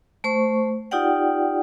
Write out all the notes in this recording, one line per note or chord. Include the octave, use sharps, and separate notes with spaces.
A3 C5 C#6
D#4 F4 G4 D5 F#5 G5